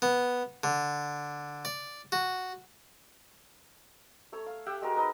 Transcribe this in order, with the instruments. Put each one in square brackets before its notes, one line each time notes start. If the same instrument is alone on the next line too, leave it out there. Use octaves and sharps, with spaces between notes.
[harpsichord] B3
D3
D5
F#4
[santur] A3 A4 C#5
F5
G4 E5 F#5 G5
G#3 F#4 A#4
D#4 B4 D#5